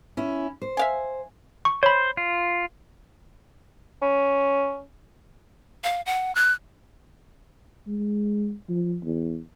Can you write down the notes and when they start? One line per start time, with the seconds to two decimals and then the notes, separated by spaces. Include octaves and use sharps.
0.17 C#4 E4
0.62 C5
0.77 E5 F5 G#5
1.65 C#6
1.83 C5 C#5 B5
2.17 F4
4.02 C#4
5.84 F5
6.06 F#5
6.35 F#6
7.87 G#3
8.69 F3
9.04 E2